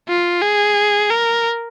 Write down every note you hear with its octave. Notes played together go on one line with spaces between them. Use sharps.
F4
G#4
A#4